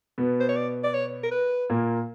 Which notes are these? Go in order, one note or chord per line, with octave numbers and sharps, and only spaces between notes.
B2 B3
C5
C#5
D5
D5
C#5
A#4
B4
A#2 A#3